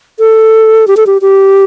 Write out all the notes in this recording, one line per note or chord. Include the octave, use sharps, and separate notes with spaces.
A4
G4
A4
G4
G4